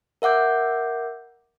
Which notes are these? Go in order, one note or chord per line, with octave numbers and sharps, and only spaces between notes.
A#4 E5 F#5 D6 G6